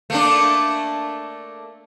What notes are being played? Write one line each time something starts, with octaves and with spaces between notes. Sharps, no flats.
A3 A#3 D4